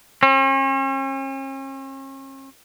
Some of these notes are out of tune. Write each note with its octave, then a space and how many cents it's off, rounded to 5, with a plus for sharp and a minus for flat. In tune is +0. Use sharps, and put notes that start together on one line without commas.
C#4 -45